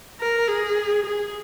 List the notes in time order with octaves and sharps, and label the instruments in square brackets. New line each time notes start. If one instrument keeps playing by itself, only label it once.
[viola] A#4
G#4
G#4